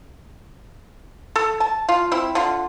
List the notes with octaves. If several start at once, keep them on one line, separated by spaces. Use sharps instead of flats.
A4
A5
F4
C4 E4
D3 F4